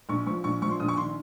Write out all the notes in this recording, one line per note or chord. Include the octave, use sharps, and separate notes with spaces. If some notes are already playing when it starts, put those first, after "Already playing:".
A#1 C#6
F3 C#6
A#1 C#6
F3 C#6
C6
A#1 D#6
C#6
D#3 C6